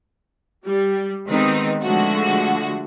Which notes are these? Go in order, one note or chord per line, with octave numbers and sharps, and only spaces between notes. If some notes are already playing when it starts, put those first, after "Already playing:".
G3
D#3 G#3 B3 C4 D#4
D3 F3 G#3 A3 F#4